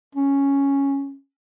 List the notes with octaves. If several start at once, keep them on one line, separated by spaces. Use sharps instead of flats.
C#4